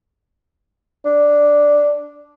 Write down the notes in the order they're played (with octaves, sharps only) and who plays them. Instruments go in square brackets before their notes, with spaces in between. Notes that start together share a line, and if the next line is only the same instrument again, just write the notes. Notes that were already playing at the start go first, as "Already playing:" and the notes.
[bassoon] D4